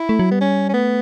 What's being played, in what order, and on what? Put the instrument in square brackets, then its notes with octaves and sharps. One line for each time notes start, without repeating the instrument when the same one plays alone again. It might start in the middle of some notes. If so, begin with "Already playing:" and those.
Already playing: [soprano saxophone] E4
[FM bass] A3
F#3
[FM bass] G3 [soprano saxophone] B3
[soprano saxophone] C#4
C#4
[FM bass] A3 [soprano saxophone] B3